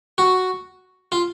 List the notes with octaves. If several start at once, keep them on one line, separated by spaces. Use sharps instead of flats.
F#4
F4